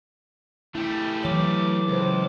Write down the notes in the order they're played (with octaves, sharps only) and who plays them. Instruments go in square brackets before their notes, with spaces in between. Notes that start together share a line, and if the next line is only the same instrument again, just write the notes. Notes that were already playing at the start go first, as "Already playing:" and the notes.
[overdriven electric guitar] A3 G4 [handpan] E4
[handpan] E3 [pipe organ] F#3 D6
[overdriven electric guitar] C#2 [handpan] A4 C5